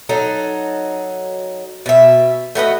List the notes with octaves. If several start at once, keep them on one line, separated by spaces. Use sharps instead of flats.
F#3 D#4 A4
B2 E5
A3 F#4 B4 D#5